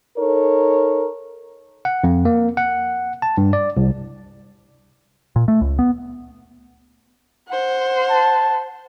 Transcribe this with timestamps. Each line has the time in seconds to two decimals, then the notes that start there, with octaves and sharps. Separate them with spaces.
0.18 D#4 A4 A#4 C#5
1.85 F#5
2.04 F2
2.25 A#3
2.57 F#5
3.22 A5
3.37 G2
3.53 D5
3.77 C2
5.36 A#2
5.48 A3
5.61 C#2
5.79 B3
7.48 C5 F#5
8.10 A5